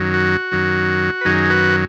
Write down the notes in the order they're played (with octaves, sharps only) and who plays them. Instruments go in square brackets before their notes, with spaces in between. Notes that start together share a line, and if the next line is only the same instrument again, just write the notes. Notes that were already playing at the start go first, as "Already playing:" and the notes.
Already playing: [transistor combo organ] F#2 D#3 F#3
F#4
F#2 D#3 F#3
B4
F#2 D#3 F#3 D#4 G#4
F#4 B4